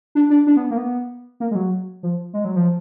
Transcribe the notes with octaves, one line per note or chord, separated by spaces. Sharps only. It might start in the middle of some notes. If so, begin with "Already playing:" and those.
D4
D4
D4
B3
A#3
B3
A#3
G#3
F#3
F3
G#3
F#3
F3